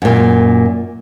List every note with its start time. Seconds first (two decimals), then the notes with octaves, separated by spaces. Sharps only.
0.02 F#2 A#2